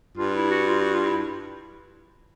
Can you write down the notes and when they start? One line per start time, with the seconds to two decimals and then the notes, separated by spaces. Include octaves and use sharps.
0.17 G2 F4
0.35 E4
0.51 F#4
0.67 F4
0.81 F#4
0.93 F4
1.06 E4